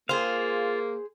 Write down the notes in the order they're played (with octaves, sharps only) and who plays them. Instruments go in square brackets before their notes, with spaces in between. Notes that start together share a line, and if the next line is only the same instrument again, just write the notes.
[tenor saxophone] A#3 [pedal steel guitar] F4 F5 [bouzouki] G#4 C5